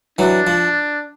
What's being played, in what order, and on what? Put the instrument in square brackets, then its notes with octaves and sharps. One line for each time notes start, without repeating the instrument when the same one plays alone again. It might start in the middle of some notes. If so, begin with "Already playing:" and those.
[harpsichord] E3 F#3 [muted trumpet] D4
[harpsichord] F3